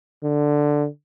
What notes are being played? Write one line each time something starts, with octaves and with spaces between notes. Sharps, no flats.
D3